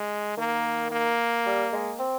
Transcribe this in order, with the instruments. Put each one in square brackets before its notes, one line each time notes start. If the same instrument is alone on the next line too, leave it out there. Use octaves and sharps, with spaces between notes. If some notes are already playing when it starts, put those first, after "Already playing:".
Already playing: [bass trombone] G#3
[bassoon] D#3 [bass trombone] A#3
[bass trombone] A#3
[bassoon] G3
G#3
C4